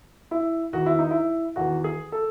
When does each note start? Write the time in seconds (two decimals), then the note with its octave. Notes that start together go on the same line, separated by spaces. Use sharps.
0.31 E4
0.73 E2 D#3 F#4
0.86 E4
0.99 D#4
1.11 E4
1.56 E2 D#3 F#4
1.84 G#4
2.12 A4